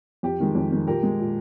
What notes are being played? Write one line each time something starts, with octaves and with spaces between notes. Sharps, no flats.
F2 G4
D#3 G#3
F2
D#3 G#3
A#2 G4 A#4
G#3
A#2